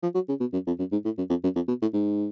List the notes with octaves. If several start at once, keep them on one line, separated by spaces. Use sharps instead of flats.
F3
F#3
C#3
B2
F#2
F2
F#2
G#2
A2
F#2
F2
F#2
F2
B2
A2
G#2